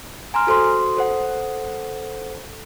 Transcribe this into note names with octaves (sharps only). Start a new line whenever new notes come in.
G#5 A#5 C6 F6
F#4 A4 C5 C6
A4 C5 F#5